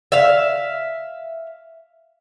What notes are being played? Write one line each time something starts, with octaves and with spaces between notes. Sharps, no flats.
E5 F5